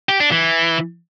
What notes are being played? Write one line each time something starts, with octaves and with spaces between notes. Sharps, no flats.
G4
D4
E3